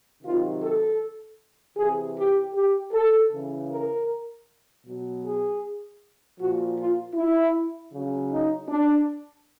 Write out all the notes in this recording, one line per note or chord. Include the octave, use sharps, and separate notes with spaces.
C3 D#3 F#3 F4
A4
C3 E3 G#4
G4
G4
A4
C#3 E3
A#4
B2 F#3
G#4
A#2 F3 F#4
F4
E4
C#3 F#3
D#4
D4